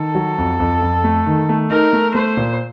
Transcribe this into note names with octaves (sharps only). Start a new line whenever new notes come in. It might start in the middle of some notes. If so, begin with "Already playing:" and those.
Already playing: D#3 A4
F#3
F2
F2
F2
A3
D#3
A3
D#4 A#4
A3
A3 C5
A#2